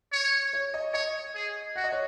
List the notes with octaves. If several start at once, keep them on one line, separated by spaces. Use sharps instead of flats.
C#5
C#5
D#5
C#5 D#5
G#4
F#4 F#5
D#5
C#5